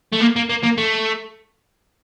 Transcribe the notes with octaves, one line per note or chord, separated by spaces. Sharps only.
A3
A#3
A#3
A#3
A#3
A3